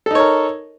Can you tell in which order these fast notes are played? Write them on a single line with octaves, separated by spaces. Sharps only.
A4 D#4 C#5 A#4